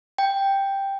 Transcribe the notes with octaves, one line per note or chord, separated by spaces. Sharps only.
G5